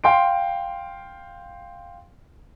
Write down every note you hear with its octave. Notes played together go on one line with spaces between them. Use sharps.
F5 G5 C6 D7